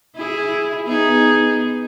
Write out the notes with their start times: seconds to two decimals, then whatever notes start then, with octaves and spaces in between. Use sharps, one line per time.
0.16 E4 G#4
0.86 B3 D#4 G#4